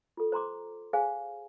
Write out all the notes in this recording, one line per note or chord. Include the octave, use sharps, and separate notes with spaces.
F4 A4
C5 A#5 C6 D6
G#4 C5 F5 G#5